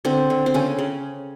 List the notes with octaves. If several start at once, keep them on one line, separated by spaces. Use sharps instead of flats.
D3 C4
D3
C4
C#3 C#4
C#3